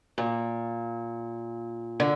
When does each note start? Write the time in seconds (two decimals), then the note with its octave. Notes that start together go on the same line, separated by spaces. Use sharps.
0.18 A#2
2.00 D3